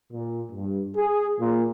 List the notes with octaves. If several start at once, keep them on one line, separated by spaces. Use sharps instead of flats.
A#2
G2
G#4
A#2